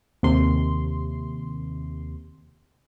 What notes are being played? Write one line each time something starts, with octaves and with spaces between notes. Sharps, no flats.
D#2 C3 C6